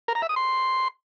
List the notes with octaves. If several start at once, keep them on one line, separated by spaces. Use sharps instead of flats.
A#4
A#5
E5
D#6
C6